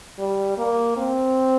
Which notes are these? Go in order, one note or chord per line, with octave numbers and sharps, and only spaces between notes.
G3
A#3
C4